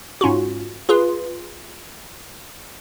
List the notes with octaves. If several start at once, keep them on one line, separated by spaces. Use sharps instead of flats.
G#2 C#4 F4 F#4
F4 G#4 B4 C6